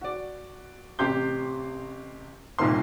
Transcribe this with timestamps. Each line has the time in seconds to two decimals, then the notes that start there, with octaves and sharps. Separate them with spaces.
0.01 F#4 D5
0.99 A1 C3 G4 C6 G6
2.59 G1 C2 A#2 D#3 A#3 C6